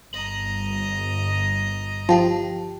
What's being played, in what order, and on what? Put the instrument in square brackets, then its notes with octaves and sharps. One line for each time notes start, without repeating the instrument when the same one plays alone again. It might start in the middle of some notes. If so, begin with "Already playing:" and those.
[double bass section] G1 [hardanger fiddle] D#5 A#5 [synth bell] F#7
[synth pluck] F3 [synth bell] G4 G5 A5